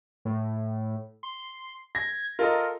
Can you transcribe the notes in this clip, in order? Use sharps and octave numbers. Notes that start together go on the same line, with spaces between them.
A2
C6
G#6 A#6
F4 A4 A#4 D#5